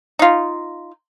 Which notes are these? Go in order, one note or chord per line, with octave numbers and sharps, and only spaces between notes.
D#4 F4